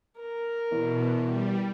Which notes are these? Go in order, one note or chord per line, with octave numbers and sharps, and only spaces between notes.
A#4
E2 B2
G3